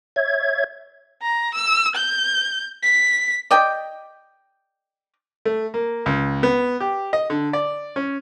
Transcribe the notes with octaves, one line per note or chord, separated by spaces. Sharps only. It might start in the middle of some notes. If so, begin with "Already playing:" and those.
C#5 E5 G#6
A#5
E6
G6
B6
D5 D#5 G5
A3
A#3
C#2
B3
G4
D#5
D3
D5
C#4